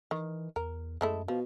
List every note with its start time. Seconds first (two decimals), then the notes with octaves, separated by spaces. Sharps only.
0.11 D#3 E3
0.56 E2 A#4
1.01 F#2 G#3 A3 E4
1.28 B2 F3